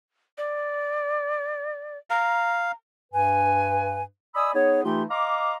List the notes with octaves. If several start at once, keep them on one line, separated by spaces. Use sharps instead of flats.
D5
F5 A#5
G2 B4 G#5
D5 D#5 G#5 B5 D#6 E6
B3 D#4 G#4 C#5
E3 A3 D#4 F4 G4 C6
D#5 F5 A#5 C6 D6